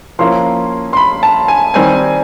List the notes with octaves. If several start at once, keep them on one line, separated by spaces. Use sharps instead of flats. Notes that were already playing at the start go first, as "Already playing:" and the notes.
F3 A#3 C#4 E4 C6
C6
B5
A5
G#5
D#3 G3 C4 G#5